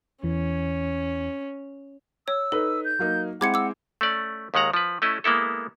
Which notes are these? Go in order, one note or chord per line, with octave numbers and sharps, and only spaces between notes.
E2 E3 C#4
C#5 E6
D#4 A4 B4
G6
F#3 A#3 D#4
G#3 C4 E4 F#5 D6 G#6 C#7
D6 E6
A3 C#4 D5
D#2 D#3 G#3 F#5 A#5
F3 B4
A3 C#4 E4 D#5
G#3 A#3 B3 E4 A4